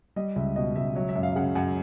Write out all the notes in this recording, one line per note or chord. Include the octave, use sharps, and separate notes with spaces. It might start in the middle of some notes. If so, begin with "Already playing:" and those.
G3 D#5
C#2 E5
B2 D#5
C#2 E5
F#3 E5
E5
F#2
F5
C#3 F#5
F#2 F#5